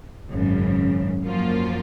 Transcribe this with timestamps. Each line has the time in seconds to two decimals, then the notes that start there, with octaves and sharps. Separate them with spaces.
0.32 G#1 F#2 C#3
1.24 F#2 F3 A#3 F4